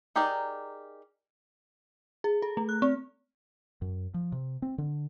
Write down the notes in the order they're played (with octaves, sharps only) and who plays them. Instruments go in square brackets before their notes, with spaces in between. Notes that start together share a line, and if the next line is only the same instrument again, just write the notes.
[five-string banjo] D#4 G4 G#4 A#4 D5
[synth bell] G#4
A4
A3
F#6
C4
[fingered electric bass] F#2
F3
C3
C4
D3